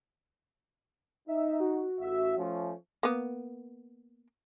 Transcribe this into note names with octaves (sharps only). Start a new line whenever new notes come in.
D#4 E5
F#4
A1 E5
F3 A3 C#4
A#3 B3